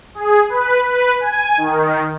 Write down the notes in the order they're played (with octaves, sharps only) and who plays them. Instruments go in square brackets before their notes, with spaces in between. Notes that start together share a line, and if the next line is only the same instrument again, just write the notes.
[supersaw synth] G#4
B4
B4
G#5
D#3